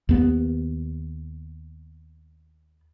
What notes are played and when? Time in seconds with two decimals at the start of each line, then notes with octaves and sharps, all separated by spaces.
0.09 D#2 B3